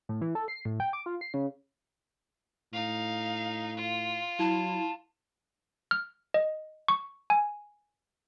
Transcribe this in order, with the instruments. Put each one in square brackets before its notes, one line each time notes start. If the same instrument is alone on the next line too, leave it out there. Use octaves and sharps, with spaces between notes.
[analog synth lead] A2
E3
A4
C7
A2
G5
D6
F4
C7
C#3
[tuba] A2 [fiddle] D#4 F5
[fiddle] F4
[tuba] F#3 [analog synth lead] E4 [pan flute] A5
[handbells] F6
D#5
C#6
G#5